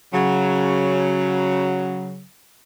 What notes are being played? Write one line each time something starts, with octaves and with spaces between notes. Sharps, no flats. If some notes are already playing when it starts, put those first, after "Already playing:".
C#3 F#3